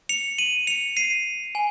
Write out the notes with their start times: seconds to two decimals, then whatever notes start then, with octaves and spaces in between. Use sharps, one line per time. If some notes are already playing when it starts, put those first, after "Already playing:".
0.09 C#7 F7
0.38 D#7 F#7
0.67 C#7 F7
0.97 C7 D#7
1.55 G#5